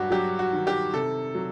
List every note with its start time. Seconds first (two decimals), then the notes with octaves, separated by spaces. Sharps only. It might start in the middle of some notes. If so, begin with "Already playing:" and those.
Already playing: G2 F#3 F#4 G4
0.11 F#3 G4
0.39 F#4
0.52 D#3
0.67 G4
0.93 C3 A4
1.35 F#3